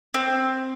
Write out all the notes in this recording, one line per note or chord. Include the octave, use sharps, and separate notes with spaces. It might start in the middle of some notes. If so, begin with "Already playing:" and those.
C4